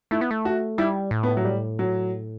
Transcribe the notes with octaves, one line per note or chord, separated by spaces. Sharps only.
A3 E4
B3
A3
F#4
G3 E4
A2
B3
F#3
G3
F#3